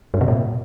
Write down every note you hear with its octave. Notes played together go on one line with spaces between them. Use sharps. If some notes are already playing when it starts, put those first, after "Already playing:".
G2
C3
A#2